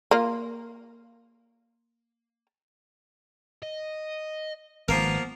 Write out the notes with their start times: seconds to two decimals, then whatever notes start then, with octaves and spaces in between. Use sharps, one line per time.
0.11 A#3 F4
3.63 D#5
4.88 G#1 F3 A#3 B3 A#4